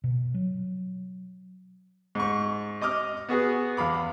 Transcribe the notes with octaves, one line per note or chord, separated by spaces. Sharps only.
B2
F#3
G#2 C#6
D#5 D6 D#6 F6
B3 F#4 G#4 B4
E2 F5 B5 D6